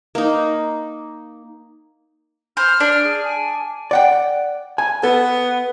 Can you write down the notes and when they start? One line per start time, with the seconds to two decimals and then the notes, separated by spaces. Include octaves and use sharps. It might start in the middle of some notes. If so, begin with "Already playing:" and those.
0.15 A#3 D#4
2.57 C5 F6
2.80 D4
3.03 G#4
3.25 G#5
3.91 D5 F#5 G5
4.78 G#5
5.03 B3 A4